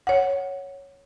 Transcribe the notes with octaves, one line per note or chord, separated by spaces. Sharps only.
C#5 F#5